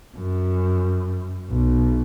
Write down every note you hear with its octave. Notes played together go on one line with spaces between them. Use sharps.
F#2
B1